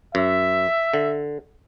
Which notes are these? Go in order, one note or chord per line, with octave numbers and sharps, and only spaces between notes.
F#2 E5
D3